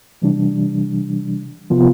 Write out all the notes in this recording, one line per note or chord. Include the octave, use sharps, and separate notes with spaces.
C3 E3 G3 D4
C3 F3 B3 F4